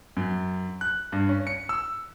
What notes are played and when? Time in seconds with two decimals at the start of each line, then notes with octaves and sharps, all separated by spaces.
0.17 F#2
0.81 F#6
1.12 G2
1.29 C#4
1.47 C#7
1.69 E6